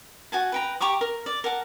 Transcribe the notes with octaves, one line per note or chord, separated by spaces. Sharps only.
F#4 G#5 A5
B4 G5 A#5
G4 A#5 C#6 D6
A#4
D5
A#4 F#5 A5